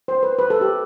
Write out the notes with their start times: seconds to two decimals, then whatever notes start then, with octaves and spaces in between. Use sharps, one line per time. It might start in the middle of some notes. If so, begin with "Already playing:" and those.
0.08 C5
0.23 B4
0.39 B4
0.50 A4
0.61 G4